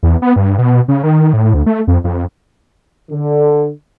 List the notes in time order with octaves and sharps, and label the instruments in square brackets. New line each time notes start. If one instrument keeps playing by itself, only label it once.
[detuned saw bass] E2
B3
G2
B2
C#3
D#3
A2
D2
A3
F2
F2
[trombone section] D3